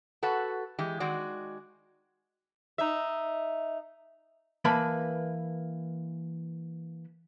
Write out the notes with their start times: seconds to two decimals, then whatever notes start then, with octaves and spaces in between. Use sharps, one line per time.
0.23 F#4 A4 B4 F#5
0.79 E3 G#3 G4
1.00 D#3 G#3 F#4 D5
2.78 D#4 E5
4.65 E3 A#3 B4 A5 B5